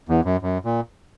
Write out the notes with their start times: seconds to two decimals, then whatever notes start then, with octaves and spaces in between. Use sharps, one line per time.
0.09 E2
0.25 F#2
0.42 F#2
0.65 A#2